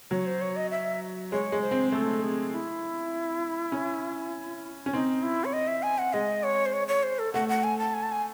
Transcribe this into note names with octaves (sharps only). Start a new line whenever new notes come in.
F#3 C#5
C5
C#5
D#5
E5
G#3 C#5
G#3
C5
C4
A3 A4
G#4
E4
C#4
C#4
C4 D#4
E4
C#5
D#5
E5
G#5
F#5
G#3 D#5
C#5
C5
C#5
C#5
C5
A4
A3 F#5
F#5
G#5
A5
G#5
A5
G#5